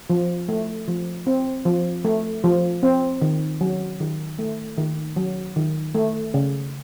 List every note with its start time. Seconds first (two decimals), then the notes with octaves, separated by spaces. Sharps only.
0.10 F3
0.49 A3
0.88 F3
1.27 C4
1.65 F3
2.05 A3
2.44 F3
2.83 C4
3.22 D#3
3.61 F#3
4.00 D#3
4.39 A3
4.78 D#3
5.16 F#3
5.56 D#3
5.95 A3
6.34 C#3